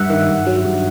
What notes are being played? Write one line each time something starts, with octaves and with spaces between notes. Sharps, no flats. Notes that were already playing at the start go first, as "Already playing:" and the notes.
Already playing: G2 E5 F#5
D#3
G2
F#3
G2